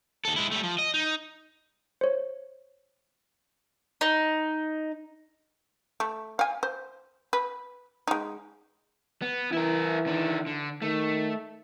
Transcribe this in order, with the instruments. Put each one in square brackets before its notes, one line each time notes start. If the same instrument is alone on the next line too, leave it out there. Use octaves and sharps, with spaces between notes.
[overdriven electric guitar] D#2 A4
G#3 E4
G3 A3
F3
D#5
D#4
[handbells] C5 C#5
[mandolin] D#4
[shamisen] A3
F5 G#5
C5
B4
G#3 D#4
[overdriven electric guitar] B3
[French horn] E3 [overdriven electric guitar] E4 A#4
[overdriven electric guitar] D#3 D4
D3
[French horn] D#3 [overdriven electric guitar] A3